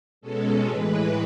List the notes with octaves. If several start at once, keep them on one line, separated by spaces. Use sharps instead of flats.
B2 G#3 C#4 A4
A2 E3 G#3 B4